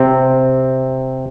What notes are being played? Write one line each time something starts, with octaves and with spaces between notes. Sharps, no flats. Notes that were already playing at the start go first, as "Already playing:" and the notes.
Already playing: C3 C4